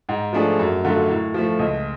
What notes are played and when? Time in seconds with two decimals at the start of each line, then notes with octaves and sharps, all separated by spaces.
0.09 G#2
0.33 F3 A3 D4 G#4
0.59 F#2
0.84 D3 F#3 A3 F4
1.08 A2
1.34 F3 A3
1.59 C#2